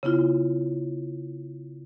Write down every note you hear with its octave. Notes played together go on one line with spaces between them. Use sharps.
C#3 B3 E4 F4